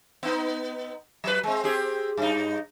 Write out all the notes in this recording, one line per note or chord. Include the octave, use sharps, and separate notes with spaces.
B3 D#4
F#3 B4
G#3 C4
C4 G4 G#4
G2 D#4